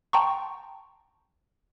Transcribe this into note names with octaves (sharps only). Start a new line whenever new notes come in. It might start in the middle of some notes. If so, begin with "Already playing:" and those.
G5 A5 A#5 C6 C#6